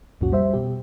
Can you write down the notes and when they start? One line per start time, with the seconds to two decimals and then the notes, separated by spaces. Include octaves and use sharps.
0.21 C2 F2 A#2 C#4 F#4
0.32 G3 C5 E5
0.53 B2 G4